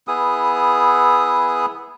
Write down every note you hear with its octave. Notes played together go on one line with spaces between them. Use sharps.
B3 E4 G#4 D#6